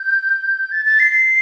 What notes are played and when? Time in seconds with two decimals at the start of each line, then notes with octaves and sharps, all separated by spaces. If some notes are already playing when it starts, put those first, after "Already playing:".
Already playing: G6
0.72 A6
0.86 A6
1.00 C7